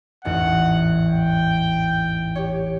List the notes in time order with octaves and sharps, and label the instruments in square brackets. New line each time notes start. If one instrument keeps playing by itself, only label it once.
[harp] A1 E2 G#2 [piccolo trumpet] F#5
[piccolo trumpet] G5
[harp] G4 C#5